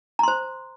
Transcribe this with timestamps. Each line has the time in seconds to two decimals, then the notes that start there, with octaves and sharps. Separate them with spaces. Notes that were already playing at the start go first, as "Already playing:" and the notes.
0.19 A#5
0.23 C6
0.28 C5